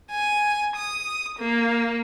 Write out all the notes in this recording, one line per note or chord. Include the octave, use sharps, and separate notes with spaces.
G#5
D#6
A#3